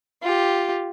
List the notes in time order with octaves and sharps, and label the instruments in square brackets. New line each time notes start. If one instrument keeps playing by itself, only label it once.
[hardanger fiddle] F4 G4